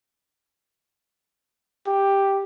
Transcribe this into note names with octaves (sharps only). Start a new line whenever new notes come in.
G4